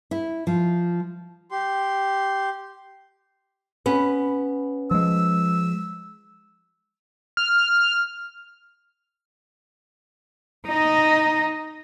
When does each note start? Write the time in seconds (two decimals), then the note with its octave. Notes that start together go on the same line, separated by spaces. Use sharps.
0.11 E4
0.47 F3
1.50 G4 C6
3.86 B3 C#4
4.91 F3 G#3 E6
7.37 F6
10.68 D#4 D#5